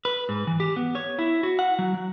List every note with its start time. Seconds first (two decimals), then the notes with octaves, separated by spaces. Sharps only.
0.05 B4
0.29 G#2
0.47 E3
0.60 G4
0.76 B3
0.95 C#5
1.19 E4
1.43 F#4
1.59 F#5
1.79 F#3
1.94 F#3